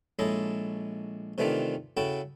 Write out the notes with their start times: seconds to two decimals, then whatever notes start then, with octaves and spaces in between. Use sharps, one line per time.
0.19 A#1 G#3 E4 A4 C#5 D#5
1.38 C3 D#3 E3 A3 D4 F4
1.97 C#3 E4 F#4 A4 G5